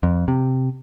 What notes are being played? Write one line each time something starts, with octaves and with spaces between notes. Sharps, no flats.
F2
C3